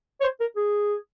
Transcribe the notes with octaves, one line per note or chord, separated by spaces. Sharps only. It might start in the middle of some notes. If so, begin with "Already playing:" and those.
C#5
C5
A#4
G#4